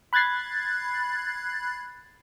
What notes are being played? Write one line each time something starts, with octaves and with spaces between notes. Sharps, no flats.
B5 F#6 G#6 A6 C7